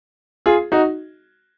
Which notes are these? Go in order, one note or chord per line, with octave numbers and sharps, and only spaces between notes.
F4 G#4
D#4 F#4